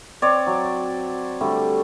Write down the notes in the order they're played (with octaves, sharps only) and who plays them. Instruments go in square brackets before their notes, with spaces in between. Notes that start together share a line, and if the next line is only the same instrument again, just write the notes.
[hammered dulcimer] C4 [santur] C#5 D5
[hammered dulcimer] F#3
D3 G3 A3